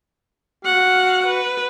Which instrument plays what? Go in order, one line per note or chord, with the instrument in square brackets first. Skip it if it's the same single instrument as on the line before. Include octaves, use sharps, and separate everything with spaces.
[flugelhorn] F#4 [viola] F5 F#5
[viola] B4